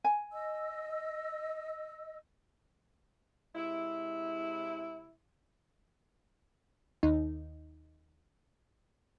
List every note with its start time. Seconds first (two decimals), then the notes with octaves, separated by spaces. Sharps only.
0.04 G#5
0.32 D#5 E6
3.56 C3 G#3 E4
7.03 D#2 D#4